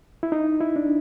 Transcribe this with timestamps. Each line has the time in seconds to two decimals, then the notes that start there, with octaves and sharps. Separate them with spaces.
0.23 E4
0.32 D#4
0.61 E4
0.76 D4